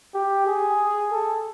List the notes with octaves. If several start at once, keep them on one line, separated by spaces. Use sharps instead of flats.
G4
G#4
A4